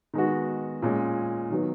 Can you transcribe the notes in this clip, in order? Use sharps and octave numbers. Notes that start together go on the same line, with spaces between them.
D#3 G#3 B3 F#4
A#2 G#3 C#4
D#3 F#3 B3